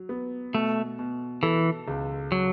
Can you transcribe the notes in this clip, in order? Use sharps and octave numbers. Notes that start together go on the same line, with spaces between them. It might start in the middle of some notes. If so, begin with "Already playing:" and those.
Already playing: F#3
B3
B2 A3
B2
E3 A4
C#2
F#3